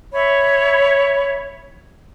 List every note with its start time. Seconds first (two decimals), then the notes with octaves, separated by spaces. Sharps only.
0.12 C#5 E5 B5